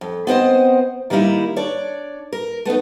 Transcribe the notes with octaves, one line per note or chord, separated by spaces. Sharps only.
F2
B3 C4 C5 D#5
D#3 G3 A#3 D#4 E4
D4 C#5 D5
A#4
A3 B3 C4 D#4